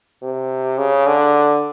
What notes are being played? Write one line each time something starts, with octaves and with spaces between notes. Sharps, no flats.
C3
C#3
D3